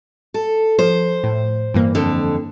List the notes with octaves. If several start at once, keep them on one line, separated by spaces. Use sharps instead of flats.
A4
F3 C5
A2
G2 E3 A#3
F2 D3